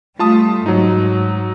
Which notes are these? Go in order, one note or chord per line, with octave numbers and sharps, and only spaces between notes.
G3 A3 F4 A5 D#6
G#2 F#3 D#4